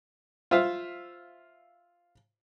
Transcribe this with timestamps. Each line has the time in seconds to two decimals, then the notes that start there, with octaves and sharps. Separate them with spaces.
0.51 F4 C5 E5 F5